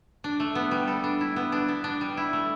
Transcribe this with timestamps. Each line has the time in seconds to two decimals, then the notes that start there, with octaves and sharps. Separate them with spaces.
0.24 D4
0.40 A3
0.55 B3
0.71 G3
0.87 A4
1.04 D4
1.21 E4
1.36 B3
1.52 D4
1.69 B3
1.84 D4
2.01 G3
2.17 E4
2.33 A3